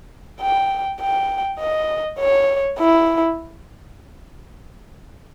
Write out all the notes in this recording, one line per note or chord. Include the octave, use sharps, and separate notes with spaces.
G5
G5
D#5
C#5
E4